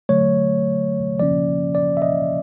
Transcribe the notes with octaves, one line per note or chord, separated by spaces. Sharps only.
D3 F#3 A3 C#5
C#3 F3 A#3 C#4 D5
D5
E5
D#5